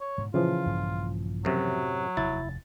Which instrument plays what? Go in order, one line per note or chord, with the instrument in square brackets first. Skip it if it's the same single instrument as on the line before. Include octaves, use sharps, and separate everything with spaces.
[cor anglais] C#5
[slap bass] G#2 B2 D3
[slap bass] A#2 [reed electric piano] C#3 E3 F3 [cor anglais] F4
[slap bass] A#1 G2 A#3
[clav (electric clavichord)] F#2 C3 [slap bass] A2 [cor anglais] F#3
[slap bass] F1 D#2 C3 [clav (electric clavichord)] E4 [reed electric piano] A6